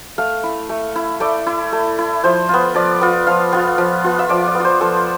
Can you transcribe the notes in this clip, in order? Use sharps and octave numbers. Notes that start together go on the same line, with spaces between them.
A3 F5
E4
A3
E4
A3 D5
E4
A3
E4
F3 C5
B3 F4
F3 D5
B3 F4
F3 F5
B3 F4
F3
B3 F4
E5
F3 D5
D5
B3
F4 C5
F3 A4